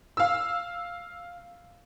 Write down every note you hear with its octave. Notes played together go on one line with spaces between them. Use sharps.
F5 E6